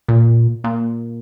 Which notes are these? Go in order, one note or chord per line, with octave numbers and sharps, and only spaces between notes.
A#2
A#2